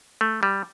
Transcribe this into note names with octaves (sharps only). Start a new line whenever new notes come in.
A3
G3